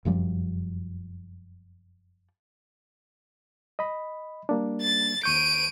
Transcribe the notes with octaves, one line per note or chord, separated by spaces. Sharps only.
F1 F#2 F3 G3
D#5 B5
G3 A#3 D4
A6
D#2 C#6 G6 D7 D#7